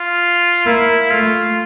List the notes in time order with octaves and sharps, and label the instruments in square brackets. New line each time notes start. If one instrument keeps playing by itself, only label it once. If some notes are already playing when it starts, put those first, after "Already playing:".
Already playing: [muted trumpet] F4
[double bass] A#3 [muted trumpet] E4
[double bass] A3 [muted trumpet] F4